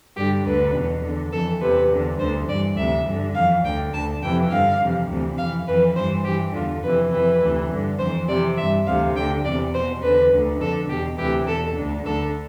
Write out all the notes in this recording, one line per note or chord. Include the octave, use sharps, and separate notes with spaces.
G2 D3 G4
D2 D3 B4
E2 B2
E2 D3
F2 E3 A4
E2 C3 E3 B4
E2 D3
D2 D3 C5
G2 E3 D5
D2 C3 E3 E5
G2 D3
F2 E3 F5
D2 D3 G5
D2 D3 A5
F2 C3 E3 G5
G2 D3 F5
F2 C3 E3
D2 C3 E3
F2 E3 F5
F2 E3 B4
G2 E3 C5
G2 E3 G4
E2 D3 F4
F2 C3 E3 B4
F2 E3 B4
D2 C3 E3
G2 D3
F2 E3 C5
F2 C3 E3 D5
G2 E3 E5
D2 C3 E3 F5
D2 D3 G5
E2 C3 E3 D5
E2 B2 C5
E2 D3 B4
D2 D3
F2 D3 A4
E2 B2 G4
D2 C3 E3 G4
E2 B2 A4
D2 D3
D2 D3 A4